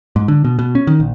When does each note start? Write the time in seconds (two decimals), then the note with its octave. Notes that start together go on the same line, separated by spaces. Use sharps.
0.16 G#2
0.28 D3
0.45 B2
0.59 B2
0.75 C#4
0.87 D#3
1.00 A#1